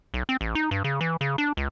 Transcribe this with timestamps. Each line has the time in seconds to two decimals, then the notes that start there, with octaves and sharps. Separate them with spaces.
0.14 B1
0.29 C4
0.41 A1
0.55 D#4
0.71 G2
0.84 C#3
1.01 E3
1.21 C#3
1.38 D4
1.57 C#2